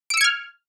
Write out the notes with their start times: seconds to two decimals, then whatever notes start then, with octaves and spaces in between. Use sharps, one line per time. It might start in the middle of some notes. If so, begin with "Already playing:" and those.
0.10 D7
0.14 E6
0.17 C#7
0.21 G#6
0.24 F6